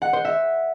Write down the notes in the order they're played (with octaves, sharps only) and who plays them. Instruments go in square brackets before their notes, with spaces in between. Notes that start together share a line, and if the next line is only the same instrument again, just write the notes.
[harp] F#5
C5
E5